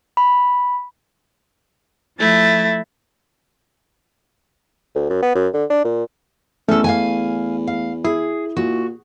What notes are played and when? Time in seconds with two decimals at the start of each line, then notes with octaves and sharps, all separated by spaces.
0.17 B5
2.18 F3 A3 E4 A6
4.95 D2
5.10 F#2
5.22 B3
5.35 F#2
5.54 D3
5.70 D4
5.85 A#2
6.68 E2 A3 C#4 A4
6.84 F5 F#5 G#5
7.67 F5
8.05 E4 G#4
8.57 A#2 F#4